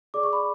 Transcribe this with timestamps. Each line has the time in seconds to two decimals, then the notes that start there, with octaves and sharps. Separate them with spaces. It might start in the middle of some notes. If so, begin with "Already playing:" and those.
0.14 G#4 D5 D6
0.23 C#6
0.33 B5